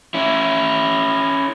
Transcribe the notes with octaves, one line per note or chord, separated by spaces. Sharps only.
C#4 E4